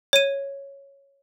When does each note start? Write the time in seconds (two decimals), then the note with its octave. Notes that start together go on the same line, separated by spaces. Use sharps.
0.13 C#5 D#7